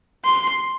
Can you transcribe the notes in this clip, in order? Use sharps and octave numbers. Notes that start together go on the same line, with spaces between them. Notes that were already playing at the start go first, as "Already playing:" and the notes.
C6